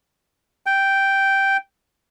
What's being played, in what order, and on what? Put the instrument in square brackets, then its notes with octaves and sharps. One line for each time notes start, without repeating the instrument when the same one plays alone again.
[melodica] G5